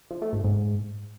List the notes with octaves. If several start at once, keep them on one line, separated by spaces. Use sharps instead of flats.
F3
A3
G#2
G#2